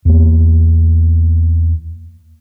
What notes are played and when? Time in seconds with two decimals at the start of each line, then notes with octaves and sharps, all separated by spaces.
0.05 E2 A#3